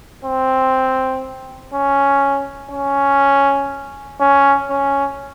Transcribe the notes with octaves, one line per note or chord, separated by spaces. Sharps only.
C4
C#4
C#4
C#4
C#4